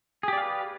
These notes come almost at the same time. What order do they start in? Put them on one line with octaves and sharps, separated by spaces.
G#4 G4 D5 F5 B4